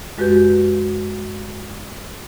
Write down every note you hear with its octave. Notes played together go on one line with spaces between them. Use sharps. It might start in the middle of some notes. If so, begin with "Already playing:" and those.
F#2 G#3 F#4 G4 B4 G6